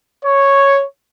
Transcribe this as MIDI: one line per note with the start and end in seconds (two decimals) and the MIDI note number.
0.24 0.82 73